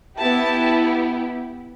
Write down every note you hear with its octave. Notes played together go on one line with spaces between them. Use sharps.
B3 E4 G4 A5